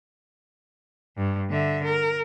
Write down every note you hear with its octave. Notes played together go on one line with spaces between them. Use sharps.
G2
D3 E5
A#4